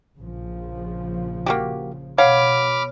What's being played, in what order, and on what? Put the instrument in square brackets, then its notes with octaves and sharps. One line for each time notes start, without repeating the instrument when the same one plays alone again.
[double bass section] A#1 C#3 F3
[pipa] A#3 F#4 G4
[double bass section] B2 [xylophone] C#5 [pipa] F5 F#5 [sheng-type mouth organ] B5 D6 F6